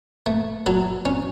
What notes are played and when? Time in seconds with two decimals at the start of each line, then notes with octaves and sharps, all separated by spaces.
0.26 A3
0.66 F#3 A4
1.05 C#4